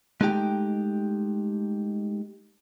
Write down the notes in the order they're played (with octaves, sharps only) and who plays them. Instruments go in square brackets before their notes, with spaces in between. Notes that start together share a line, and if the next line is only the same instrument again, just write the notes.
[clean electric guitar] G#3 A3 D#4 G4 G5